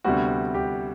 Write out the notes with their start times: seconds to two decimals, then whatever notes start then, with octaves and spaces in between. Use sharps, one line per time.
0.04 D2 C3 G3 B3 F#4
0.54 G4